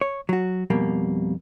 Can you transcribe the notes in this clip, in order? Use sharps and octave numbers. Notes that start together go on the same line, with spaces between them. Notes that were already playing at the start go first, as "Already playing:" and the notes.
C#5
F#3 F#4
F2 B2 G3 A#3